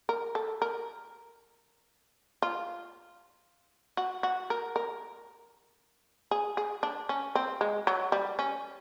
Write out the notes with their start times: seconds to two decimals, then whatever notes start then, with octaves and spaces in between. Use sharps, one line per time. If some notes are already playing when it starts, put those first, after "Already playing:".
0.09 A#4
0.35 A4
0.62 A#4
2.42 F4
3.97 F#4
4.23 F#4
4.50 A#4
4.76 A#4
6.31 G#4
6.57 G#4
6.83 D4
7.09 C#4
7.35 C4
7.61 G#3
7.87 F#3
8.12 G3
8.39 C#4